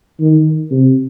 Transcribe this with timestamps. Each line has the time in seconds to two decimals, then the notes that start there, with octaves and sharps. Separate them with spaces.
0.20 D#3
0.71 C3